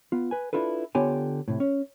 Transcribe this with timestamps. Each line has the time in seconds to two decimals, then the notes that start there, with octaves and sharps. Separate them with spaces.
0.12 B3 F4
0.31 B4 G#5
0.53 D4 E4 F4 A4 B4
0.95 D3 B3 F4 G4 C#5 G#5
1.48 A2 C3
1.60 C#4